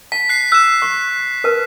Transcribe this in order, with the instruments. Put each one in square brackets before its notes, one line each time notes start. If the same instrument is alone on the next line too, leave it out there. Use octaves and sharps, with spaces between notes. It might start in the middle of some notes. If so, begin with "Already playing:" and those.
[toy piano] A5 [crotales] B6
[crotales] F#6 C7
[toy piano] E6 [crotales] F#6 E7
[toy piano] C#6
A#4 B4 A5